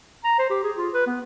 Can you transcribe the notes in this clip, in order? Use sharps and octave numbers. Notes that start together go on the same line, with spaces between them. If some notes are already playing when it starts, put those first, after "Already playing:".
A#5
C5
G4
G#4
F4
B4
B3